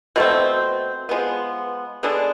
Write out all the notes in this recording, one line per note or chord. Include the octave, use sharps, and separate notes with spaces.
B2 A3 C4
F3 G#3 B3
D3 G#3 B3 D4